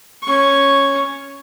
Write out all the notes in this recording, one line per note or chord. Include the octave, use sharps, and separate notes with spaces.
C#4 C#6